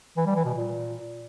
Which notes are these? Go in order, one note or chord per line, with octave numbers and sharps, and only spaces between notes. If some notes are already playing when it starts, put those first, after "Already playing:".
E3
G3
E3
B2
A#2